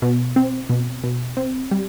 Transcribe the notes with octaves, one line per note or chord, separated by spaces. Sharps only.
B2
C4
B2
B2
C4
G3